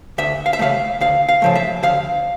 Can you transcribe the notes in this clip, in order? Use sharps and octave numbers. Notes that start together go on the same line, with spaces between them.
D2 E5
F5
E5
C#3 F3 A3 F5
D2 F5
F5
C#3 F3 A3
E5
D2 F5